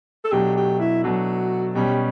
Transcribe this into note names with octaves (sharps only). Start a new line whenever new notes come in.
A4
B2 F#3 A3 D4 G4
G4
E4
B2 F#3 A3 D4 F#4
B2 G3 C#4 G4